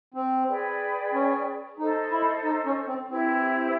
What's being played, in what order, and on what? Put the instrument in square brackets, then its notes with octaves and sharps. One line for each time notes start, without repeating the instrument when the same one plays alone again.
[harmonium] C4
[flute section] G#4 B4 D5 G5
[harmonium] C#4
[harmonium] D#4 [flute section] A4 C5 D#5
[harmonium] E4
D#4
C#4
C4
[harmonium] C4 [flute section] E4 G4 B4 E5